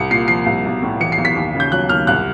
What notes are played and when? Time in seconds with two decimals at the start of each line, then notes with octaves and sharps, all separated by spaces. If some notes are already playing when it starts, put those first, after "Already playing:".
Already playing: C2 C#7
0.11 A#2 C7
0.28 F3 C7
0.46 C2
0.65 B1
0.82 A2
1.00 E3 C#7
1.12 C7
1.18 B1
1.25 B6
1.36 D#2
1.55 C#3
1.60 G6
1.72 F#3 F#6
1.89 D#2 F6
2.07 C2 F#6